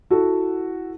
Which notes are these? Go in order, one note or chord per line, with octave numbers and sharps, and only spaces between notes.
E4 F#4 A4